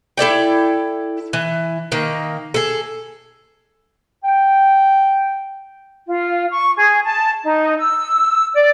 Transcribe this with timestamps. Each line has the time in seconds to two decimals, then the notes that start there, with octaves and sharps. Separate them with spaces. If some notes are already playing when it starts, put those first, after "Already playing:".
0.17 E4 A4 D5 G5
1.33 E3
1.92 D#3 A#3
2.54 G#4 A4
4.24 G5
6.07 F4
6.50 C#6
6.77 G#4
7.05 A5
7.45 D#4
7.79 E6
8.55 D5